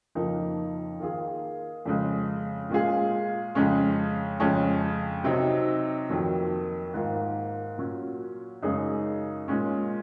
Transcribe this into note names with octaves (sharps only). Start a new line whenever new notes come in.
F2 C#3 F3 A#3 D#4
D#3 A#3 F4 G#4
F2 C#3 G#3
A#2 G#3 C#4 F4 G#4
F2 C#3 G#3 C#4
F2 C#3 G#3 C#4
C3 F#3 C4 D#4
F2 D#3 F#3 A#3
G#2 D#3 A#3 F4
A#2 F#3 C#4 F#4
F#2 C#3 G#3 D#4 G#4
A#2 G#3 C#4